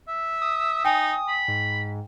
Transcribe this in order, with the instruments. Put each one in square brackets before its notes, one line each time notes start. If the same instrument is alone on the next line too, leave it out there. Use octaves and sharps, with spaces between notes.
[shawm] E5
[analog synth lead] D#6
[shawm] D#4 [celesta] G5 G#5
[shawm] B5
[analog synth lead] G#2